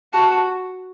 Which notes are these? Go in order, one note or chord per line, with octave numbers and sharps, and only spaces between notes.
F#4 A5